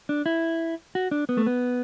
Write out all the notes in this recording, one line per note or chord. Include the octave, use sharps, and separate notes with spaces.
D4
E4
F#4
D4
B3
A3
B3